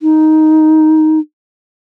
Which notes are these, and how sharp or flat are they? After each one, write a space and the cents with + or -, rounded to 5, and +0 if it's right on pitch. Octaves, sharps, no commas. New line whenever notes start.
D#4 +5